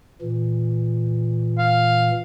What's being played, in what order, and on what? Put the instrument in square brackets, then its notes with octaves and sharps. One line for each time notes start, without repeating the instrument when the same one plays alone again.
[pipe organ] A#2 E3
[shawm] F5